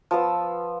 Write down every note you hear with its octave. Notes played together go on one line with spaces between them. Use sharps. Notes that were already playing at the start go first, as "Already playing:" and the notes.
F3 B3 E6